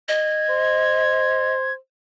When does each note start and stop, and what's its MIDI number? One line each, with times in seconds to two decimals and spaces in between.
0.09 1.54 75
0.09 1.73 92
0.50 1.76 72